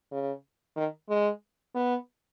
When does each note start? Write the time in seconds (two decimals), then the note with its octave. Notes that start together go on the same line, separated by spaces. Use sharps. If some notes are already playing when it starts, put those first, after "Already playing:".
0.11 C#3
0.76 D#3
1.09 G#3
1.75 B3